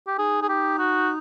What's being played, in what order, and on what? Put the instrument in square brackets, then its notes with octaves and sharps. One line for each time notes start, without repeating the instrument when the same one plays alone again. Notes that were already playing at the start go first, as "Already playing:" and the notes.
[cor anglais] G4
[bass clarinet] D#4 [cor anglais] G#4
[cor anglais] G#4
G4
F#4